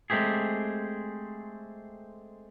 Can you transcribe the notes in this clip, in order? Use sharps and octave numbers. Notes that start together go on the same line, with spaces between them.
G#3 A3 C4 G4 G#4